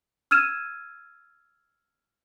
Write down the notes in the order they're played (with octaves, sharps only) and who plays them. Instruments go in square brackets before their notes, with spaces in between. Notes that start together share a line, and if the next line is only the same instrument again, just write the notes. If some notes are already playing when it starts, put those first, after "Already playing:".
[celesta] E6 F6 G#6 D#7 E7